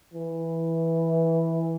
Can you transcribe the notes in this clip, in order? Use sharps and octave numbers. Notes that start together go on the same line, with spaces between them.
E3